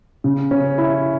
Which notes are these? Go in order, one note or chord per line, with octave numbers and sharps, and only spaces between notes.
C#3
C#4
E4